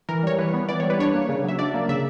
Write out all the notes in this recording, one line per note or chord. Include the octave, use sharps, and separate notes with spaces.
E3 A#4
G3 C#5
E3 B4
B3
E3 D5
G3 C#5
B4
D4 C#5
A#3
C#3
F#3 E5
D4 D5
A#3
C#3 E5